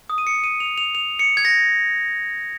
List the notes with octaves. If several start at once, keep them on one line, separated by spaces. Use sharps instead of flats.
D#6
D#7
C#7
D#7
F7
F7
F7
C#7
G#6
A#6